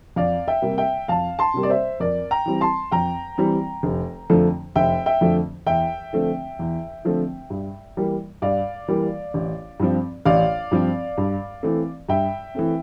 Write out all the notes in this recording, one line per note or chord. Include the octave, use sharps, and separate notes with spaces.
F2 D5 F5
E5 G5
C3 G3 A#3
E5 G5
F2 F5 A5
A5 C6
C3 G3 A#3
D5
C5 E5
F2 A#4 D5
G5 A#5
E3 G3 C4
A5 C6
F2 G5 A#5
E3 G3 C4
F1
F2 D3 F3 A3
F1 E5 G5
E5 G5
F2 D3 F3 A3
E2 E5 G5
D3 F3 A3 C4
E2
D3 F3 A3 C4
G2
E3 G3 A#3
G2 D5 F5
E3 G3 A#3
A1
G2 F3 C4
A1 D5 F5
G2 F3 C4
G2
E3 A3 C4
G2 E5 G5
E3 A3 C4